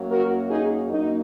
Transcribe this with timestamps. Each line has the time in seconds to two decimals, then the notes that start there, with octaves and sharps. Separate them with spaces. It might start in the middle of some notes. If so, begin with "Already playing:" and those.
Already playing: F#2 F#3 A#3
0.11 F#4 A#4
0.50 D#4 G#4
0.88 F#2 F#3 A#3 D#4